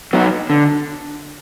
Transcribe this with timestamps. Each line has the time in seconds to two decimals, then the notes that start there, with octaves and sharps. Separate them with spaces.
0.13 F#3 B3 D#4
0.50 D3